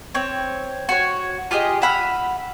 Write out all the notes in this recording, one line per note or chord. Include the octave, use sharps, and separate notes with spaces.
C4 C#5
F#4 C#5
F4 G4 G#4 D#5
E5 F#5 B5 F6